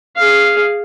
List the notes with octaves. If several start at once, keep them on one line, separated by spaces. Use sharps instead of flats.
G#4 F5